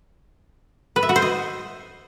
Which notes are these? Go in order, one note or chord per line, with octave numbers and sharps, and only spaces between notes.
B4
E5
F#4
C5
D#5